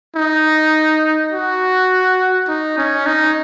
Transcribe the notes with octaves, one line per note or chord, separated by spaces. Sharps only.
D#4
F#4
D#4
C#4
D#4